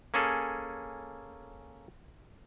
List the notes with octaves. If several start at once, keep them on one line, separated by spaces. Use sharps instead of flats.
A#3 C#4 G#4 A4